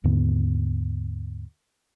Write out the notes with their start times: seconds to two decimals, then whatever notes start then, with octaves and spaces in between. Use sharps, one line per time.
0.04 D#2 G#2 D3 B3